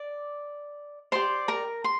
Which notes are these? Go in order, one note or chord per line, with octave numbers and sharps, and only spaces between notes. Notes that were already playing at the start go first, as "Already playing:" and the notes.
Already playing: D5 D6
G4 C5 D5 C6
A#4 A#5
C6